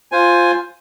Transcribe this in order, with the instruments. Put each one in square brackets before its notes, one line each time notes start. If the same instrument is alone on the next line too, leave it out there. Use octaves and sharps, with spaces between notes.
[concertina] F4 C5 G#5